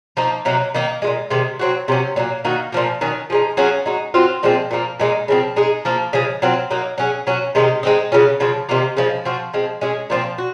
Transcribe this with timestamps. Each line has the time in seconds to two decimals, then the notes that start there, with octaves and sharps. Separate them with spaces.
0.17 F3 A#3 D#4
0.45 C3 F#3 A#3 D#4
0.74 D#3 A#3 D#4
1.02 F3 G#3
1.07 A#2
1.30 C3 D#3 G#3
1.59 F#3 C4 F#4
1.88 C3 F#3 C#4
2.16 A#2 F#3 A#3
2.45 D#3 A#3 D#4 F#4
2.72 A#2 F3 A#3
3.01 D#3 F#3 C#4
3.30 F3 G#3 D#4
3.57 F#3 C#4 F4 G#4
3.86 G#3 D#4 F#4
4.14 F#3 C4 F4
4.43 A#2 F3 G#3 C4
4.71 A#2 F3 A#3
5.00 A#2 G#3 D#4
5.28 C#3 F3 C4
5.56 G#3 D#4 G#4
5.85 F3 A#3 F4
6.13 C#3 F3 G#3
6.42 F#3 C4 F4
6.70 F#3 A#3 D#4
6.98 F#3 C#4 G#4
7.27 F#3 C#4 F#4
7.55 C3 D#3 G#3 D#4
7.83 G#3 C4 D#4
8.12 C#3 F#3 C#4 F4
8.40 C#3 F3 C4
8.69 C3 D#3 A#3 F4
8.97 C#3 F3 G#3
9.25 F3 C4 F#4
9.54 F3 G#3 C4
9.81 G#3 C#4 G#4
10.10 A#2 F3 C4 F4
10.38 F#4